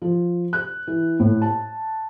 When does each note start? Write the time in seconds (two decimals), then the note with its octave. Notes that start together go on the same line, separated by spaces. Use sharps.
0.02 F3
0.53 F#6
0.87 E3
1.20 A2
1.42 A5